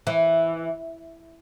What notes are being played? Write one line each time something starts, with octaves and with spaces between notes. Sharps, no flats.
E3